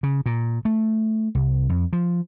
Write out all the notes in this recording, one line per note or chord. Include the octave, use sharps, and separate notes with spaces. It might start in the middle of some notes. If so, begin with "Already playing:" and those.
C#3
A#2
A3
C2
F2
F3